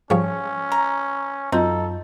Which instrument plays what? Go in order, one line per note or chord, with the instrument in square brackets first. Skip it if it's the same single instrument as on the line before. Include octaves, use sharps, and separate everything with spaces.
[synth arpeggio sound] G#2 F3 G3 [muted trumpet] C#4 [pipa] C#5
[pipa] A#5
[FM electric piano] F#2 F#3 F4 [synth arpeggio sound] C4 [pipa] D#4 [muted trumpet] A4